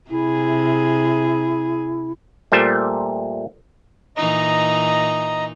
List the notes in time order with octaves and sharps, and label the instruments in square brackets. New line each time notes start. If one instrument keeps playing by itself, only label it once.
[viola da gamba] C3 G#4 [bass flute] E4
[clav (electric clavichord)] A#2 G3 A3 C5 E5
[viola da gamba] A#2 E3 D#4 [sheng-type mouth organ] D#5 A#5